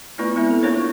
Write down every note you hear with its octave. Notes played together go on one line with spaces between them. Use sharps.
A3 B3 E4 F4 B4 D5
G#3 B3 C4 E4 E5
A4
A#3 D4 F4 A#4 C5 C#5
F4